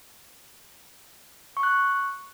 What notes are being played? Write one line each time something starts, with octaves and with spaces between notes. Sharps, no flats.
C#6
F#6
C#6